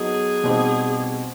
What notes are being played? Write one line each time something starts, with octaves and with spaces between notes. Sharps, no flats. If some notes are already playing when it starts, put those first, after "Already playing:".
Already playing: F#3 B3 D#4 F#4 G#4 A4
B2 G3 C4 D#4 G4